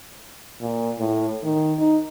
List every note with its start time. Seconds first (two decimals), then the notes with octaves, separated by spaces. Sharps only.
0.61 A#2
0.98 A2
1.43 D#3
1.79 D#4